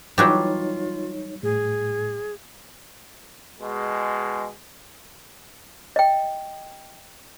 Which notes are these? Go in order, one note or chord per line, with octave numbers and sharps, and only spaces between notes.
E3 F#3 G3 D#4 F4 C#5
A2 G#4
B2 G#3
D#5 G5